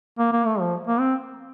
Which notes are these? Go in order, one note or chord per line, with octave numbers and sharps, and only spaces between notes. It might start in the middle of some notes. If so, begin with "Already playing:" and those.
A#3
A#3
A3
F3
A#3
C4